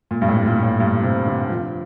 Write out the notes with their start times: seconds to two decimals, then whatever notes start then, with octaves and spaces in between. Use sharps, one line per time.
0.11 A#2
0.21 G2
0.28 A2
0.46 A#2
0.63 A2
0.80 G2
1.03 C3
1.26 D3
1.50 F3